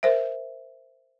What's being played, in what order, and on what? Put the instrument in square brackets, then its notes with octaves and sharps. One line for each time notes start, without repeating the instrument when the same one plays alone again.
[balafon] A#4 C5 E5